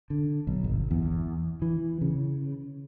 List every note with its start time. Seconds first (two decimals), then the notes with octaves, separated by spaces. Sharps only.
0.10 D3
0.47 B1
0.64 G1
0.91 E2
1.62 E3
2.01 C#3